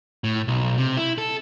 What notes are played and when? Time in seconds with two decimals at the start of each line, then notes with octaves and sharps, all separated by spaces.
0.24 A2
0.48 B1
0.78 C3
0.97 E4
1.18 A4